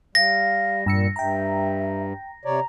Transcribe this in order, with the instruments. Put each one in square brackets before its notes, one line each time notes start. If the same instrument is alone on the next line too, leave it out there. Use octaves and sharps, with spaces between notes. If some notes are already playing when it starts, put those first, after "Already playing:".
[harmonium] G3 [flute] F5 [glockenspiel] A#6
[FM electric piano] G2 E6 C#7 [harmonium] A#2
[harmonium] G2 [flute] E5 [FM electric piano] G5 A#5
[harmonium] C3 C#5 D5 [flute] A#5